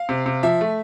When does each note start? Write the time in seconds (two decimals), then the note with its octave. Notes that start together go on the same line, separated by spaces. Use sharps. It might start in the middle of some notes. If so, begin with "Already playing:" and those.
Already playing: F5
0.09 C3
0.26 C3
0.43 F3 E5
0.61 A3